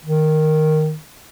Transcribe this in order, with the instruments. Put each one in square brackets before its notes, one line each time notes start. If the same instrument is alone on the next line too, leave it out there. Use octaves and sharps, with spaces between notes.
[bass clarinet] D#3